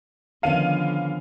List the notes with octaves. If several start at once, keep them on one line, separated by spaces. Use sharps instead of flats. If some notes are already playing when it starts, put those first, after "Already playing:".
D3 D#3 F3 B3 C#4 F5 D#7